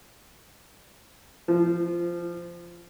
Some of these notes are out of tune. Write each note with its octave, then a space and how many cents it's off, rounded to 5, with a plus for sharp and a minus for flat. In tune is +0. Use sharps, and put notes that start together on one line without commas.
F3 -20